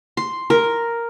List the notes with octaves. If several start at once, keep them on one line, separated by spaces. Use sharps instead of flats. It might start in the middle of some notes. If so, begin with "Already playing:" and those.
C6
A#4